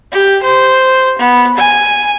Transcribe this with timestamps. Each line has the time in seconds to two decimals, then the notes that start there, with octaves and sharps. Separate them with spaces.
0.12 G4
0.43 C5
1.19 B3
1.57 G#5